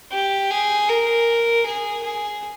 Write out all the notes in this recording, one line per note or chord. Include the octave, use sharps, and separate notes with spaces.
G4
G#4
A#4
G#4
G#4